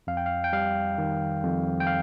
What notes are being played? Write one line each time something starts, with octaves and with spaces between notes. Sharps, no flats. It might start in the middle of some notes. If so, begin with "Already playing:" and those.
F2 F5
G5
F5
G5
G3 F5
D#3
F2
G5
F5